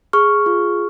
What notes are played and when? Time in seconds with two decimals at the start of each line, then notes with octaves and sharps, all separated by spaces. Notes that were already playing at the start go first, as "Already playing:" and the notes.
0.13 G#4 C#6 F6
0.46 F4